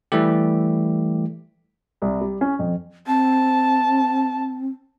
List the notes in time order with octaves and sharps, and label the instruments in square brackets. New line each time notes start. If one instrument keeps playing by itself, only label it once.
[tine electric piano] E3 G3 A3 G4
[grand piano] C2
G3
C#4
F2
[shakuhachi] C4 [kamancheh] A5